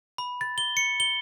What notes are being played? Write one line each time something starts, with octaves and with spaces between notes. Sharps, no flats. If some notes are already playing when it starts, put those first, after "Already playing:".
B5
A6
G7
C#7
G7